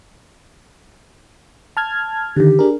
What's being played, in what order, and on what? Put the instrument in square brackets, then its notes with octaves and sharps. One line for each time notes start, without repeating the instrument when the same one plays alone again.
[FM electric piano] A5 F6 G#6
[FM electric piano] D3 D#3 [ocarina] G4
[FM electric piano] D4 G#4 A#4